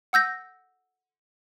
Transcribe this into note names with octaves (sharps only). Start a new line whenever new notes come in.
F#5 E6 G6 A#6